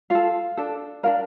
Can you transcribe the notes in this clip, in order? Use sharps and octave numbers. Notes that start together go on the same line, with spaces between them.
F4 A4 F5
D4 A4
D4 F4 A#4 F5